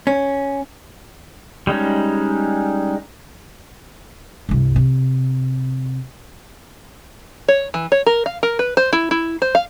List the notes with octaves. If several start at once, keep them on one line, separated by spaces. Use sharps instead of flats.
C#4
G3 G#3 C#4 D#4
C2 G2
C3
C#5
E3
C#5
A#4
F5
A#4
B4
C5
E4
E4
C5
F5